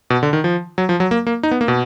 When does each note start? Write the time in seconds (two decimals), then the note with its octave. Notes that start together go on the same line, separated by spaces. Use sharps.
0.10 B2
0.23 D3
0.33 D#3
0.44 F3
0.78 F#3
0.89 F3
1.00 F#3
1.11 A#3
1.27 A#3
1.43 D#4
1.51 B3
1.61 A#3
1.68 B2